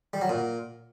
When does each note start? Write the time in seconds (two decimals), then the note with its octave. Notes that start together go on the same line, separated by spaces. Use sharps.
0.13 G3
0.21 F#3
0.29 A#2